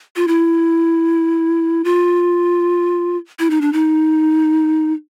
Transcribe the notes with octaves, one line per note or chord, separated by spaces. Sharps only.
F4
E4
F4
E4
D#4
D4
D#4